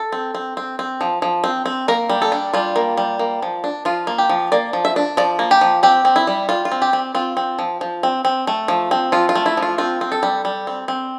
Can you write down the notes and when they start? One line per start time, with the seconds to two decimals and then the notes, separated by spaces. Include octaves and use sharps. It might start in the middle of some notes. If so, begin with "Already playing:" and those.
Already playing: A4
0.12 C4
0.35 C4
0.57 C4
0.79 C4
1.01 F3
1.22 F3
1.44 C4
1.66 C4
1.88 A#3 A#4
2.09 G3
2.22 A4
2.32 D4
2.54 G3 F4
2.76 A#3
2.97 G3
3.19 A#3
3.42 F3
3.64 D4
3.85 F3 F4
4.07 A#3
4.18 G4
4.29 F3
4.52 A#3 D5
4.73 F3
4.85 E5
4.96 D4
5.17 F3 D5
5.39 A#3
5.51 G4
5.61 F3
5.83 C4 G4
6.05 C4
6.16 E4
6.27 G3
6.49 G3 F4
6.65 F4
6.72 C4
6.82 G4
6.93 C4
7.15 C4 F4
7.37 C4
7.59 F3
7.81 F3
8.03 C4
8.25 C4
8.47 A3
8.68 F3
8.91 C4
9.12 F3 F4
9.29 F4
9.35 A3
9.46 E4
9.57 F3
9.62 F4
9.78 C4 F4
10.01 C4
10.12 A4
10.23 G3
10.45 G3
10.67 C4
10.88 C4